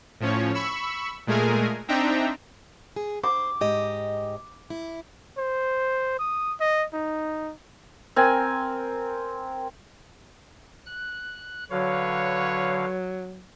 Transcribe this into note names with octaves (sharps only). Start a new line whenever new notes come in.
A2 F3 C#4 C#5
B5 C#6 E6
A#2 G#3 A3 G#4 A#4 G#5
C4 D4 D#4 E5 G5 A#5
G#4
C5 D6
G#2 G4 D#5
E4
C5
D#6
D#5
D#4
C4 A#4 G#5
F#6
D3 F#3 B4 C#5 F5